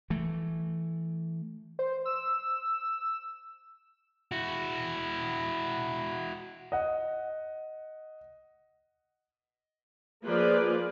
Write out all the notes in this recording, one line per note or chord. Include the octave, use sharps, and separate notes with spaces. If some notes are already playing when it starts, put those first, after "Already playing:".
E3 A3
C5
E6
E4 F#4
D#5 F#5
F3 A#3 F4 G#4 B4 D5